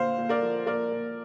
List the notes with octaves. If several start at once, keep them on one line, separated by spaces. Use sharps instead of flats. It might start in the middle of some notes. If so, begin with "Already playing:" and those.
Already playing: A#2 D3 C5 F5
A#2
A#4 D5
F3
A#2 A#4 D5
A#2